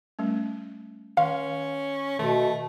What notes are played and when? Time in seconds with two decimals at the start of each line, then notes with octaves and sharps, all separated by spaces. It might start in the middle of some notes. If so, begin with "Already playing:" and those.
0.19 G3 A3 C#4
1.17 D#3 C#4 F5
2.19 B2 D#3 A3 F#4